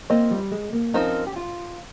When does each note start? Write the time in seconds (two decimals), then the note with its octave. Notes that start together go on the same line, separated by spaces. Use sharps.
0.10 A#3 C4 F4 C5 D#5
0.31 G3
0.52 G#3
0.73 A#3
0.94 F3 C4 C#4 D#4 A#4
1.27 G4
1.36 F4